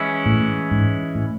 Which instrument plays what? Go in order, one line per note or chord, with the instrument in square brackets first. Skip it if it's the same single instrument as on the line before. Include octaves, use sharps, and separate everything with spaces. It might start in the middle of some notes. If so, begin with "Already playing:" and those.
Already playing: [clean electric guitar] E3 G#3 C#4 E4
[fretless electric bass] A2
G#2
A2